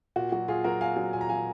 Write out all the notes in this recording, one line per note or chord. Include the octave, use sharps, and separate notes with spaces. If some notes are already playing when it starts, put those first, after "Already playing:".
A#2 F#4
F#3 F#4
A#2 F4 G#4
F#3 F#4 A#4
A#2 F5 G#5
F#3
A#2 G#5
A#5
F#3 F5 G#5